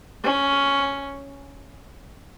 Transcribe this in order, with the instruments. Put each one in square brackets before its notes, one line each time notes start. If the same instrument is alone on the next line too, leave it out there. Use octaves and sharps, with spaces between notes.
[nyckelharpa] C#4